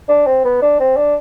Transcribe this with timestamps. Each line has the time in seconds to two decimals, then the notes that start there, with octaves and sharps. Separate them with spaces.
0.09 D4
0.27 C4
0.44 B3
0.62 D4
0.80 C4
0.97 D4